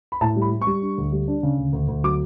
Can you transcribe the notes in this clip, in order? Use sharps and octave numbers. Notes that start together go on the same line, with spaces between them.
B5
A2 A5
G3
B5
G3
C#6
G3
D4
D2
G3
D4
C#3
D2
D2
D2
F#3 D6